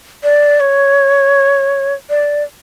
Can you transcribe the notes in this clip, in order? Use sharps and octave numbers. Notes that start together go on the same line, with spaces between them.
D5
C#5
D5